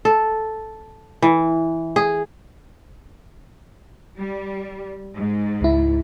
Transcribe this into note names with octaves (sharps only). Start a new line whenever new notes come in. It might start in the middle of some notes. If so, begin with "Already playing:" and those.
A4
E3
G#4
G3
G#2
C#2 E4